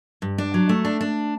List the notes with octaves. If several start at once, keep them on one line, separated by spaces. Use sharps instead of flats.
G2
D4
F#3
A3
D4
D4